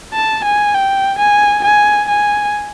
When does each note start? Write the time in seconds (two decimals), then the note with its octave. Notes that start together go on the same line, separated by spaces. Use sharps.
0.13 A5
0.44 G#5
0.74 G5
1.18 G#5
1.64 G#5
2.08 G#5